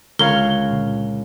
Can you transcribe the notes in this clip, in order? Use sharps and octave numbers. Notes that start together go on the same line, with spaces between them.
C#2 D3 A#4 C#5 F5 G7
A#2 D3